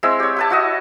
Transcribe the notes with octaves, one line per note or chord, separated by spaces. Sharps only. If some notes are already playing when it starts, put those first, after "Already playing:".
G#3 C4 E4
G4 C#5
G4 B4 A5
E4 F#4 D#5